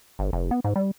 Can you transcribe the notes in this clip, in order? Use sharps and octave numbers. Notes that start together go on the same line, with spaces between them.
G1
F1
B3
G#2
G3